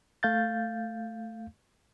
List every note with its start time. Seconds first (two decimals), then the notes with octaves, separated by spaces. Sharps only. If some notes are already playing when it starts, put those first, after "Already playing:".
0.23 A3 F5 G6 A6